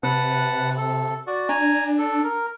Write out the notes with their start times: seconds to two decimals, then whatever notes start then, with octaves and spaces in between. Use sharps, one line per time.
0.03 C3 B4 F#5 A5
0.77 A4
1.27 F#4 D5
1.49 D4 G#5 A#5
1.98 A4
2.24 A#4